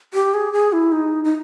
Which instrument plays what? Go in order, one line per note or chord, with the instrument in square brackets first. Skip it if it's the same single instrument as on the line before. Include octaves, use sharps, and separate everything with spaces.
[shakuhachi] G4
G#4
G#4
E4
D#4
D#4